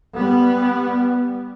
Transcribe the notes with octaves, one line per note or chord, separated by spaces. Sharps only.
G3 B3